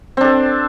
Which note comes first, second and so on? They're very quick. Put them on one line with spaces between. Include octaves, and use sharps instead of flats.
C4 D4 A4